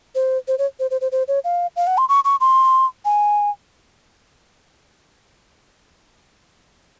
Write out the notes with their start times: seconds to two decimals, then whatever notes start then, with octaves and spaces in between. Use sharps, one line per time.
0.15 C5
0.48 C5
0.58 C#5
0.80 C5
0.91 C5
1.01 C5
1.12 C5
1.28 C#5
1.44 F5
1.76 F5
1.87 F#5
1.98 C6
2.09 C#6
2.25 C#6
2.40 C6
3.05 G#5